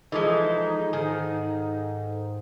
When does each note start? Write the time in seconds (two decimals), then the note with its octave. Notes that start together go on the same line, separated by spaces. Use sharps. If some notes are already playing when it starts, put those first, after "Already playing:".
0.12 E3 F3 G#3 D#4 A4 D#5
0.93 G#2 D#3 G#4